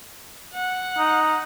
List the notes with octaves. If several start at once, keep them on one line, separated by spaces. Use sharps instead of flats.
F#5
D#4